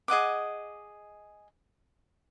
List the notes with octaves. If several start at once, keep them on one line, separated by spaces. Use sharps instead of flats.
G#4 D#5 F#5 D6